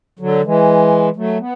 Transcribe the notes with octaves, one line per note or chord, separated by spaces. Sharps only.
D3 F#3
E3 G#3
F#3 A3
B3